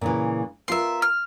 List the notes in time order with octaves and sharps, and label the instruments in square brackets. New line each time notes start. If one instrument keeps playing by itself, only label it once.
[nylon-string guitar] A#2 C#3 E3
[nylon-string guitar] B3 F4 A#4 [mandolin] E5 C6
[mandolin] F6